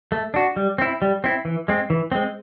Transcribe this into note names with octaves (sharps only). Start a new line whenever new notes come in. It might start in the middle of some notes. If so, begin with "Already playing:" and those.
A3
D4 F#4
G3
C4 E4
G3
C4 E4
E3
G#3 C4
E3
G#3 C4